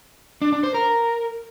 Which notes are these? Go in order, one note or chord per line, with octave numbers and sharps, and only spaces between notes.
D4
D4
C5
A#4